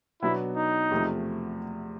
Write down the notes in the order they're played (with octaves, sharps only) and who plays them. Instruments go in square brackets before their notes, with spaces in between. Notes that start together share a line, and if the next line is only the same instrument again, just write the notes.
[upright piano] B2 F#3 B3 D4 F#4 [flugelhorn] E4
[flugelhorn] D#4
[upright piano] E2 C3 F3 A3 C4